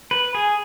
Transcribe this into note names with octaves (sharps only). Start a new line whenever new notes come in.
B4
G#4